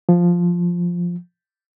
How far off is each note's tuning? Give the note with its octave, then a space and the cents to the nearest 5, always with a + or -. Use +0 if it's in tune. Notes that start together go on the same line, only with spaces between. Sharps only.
F3 +0